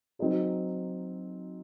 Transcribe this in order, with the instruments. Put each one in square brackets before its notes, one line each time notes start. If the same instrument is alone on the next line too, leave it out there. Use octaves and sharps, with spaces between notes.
[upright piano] F#3 C4 D#4 G#4